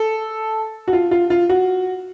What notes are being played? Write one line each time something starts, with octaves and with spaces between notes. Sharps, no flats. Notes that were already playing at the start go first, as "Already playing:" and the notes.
Already playing: A4
F#4
F4
F4
F4
F#4